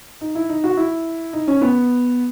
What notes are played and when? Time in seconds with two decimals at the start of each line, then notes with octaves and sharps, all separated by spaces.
0.21 D#4
0.35 E4
0.49 D#4
0.64 F#4
0.77 E4
1.33 D#4
1.48 C#4
1.61 B3